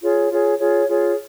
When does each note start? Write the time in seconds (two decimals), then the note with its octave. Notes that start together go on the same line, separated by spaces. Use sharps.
0.02 F4 G#4 C#5
0.30 F4 G#4 C#5
0.59 F4 G#4 C#5
0.87 F4 G#4 C#5